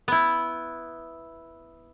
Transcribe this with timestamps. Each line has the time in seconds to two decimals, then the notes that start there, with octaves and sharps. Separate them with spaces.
0.08 B3 E4